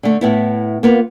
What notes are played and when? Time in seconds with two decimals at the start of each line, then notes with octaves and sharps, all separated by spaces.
0.03 D3 A3
0.21 A2 B3 E4
0.83 A#3 B3 F4